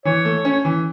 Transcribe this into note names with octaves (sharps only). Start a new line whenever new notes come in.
E3 C#5
A3
C#4
E3